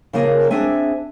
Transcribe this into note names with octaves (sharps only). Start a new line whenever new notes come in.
C#3 F3 A#3 G#4 A#4
C4 D4 G#4 E5 G#5